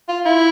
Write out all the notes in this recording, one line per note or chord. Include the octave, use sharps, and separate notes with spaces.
F4
E4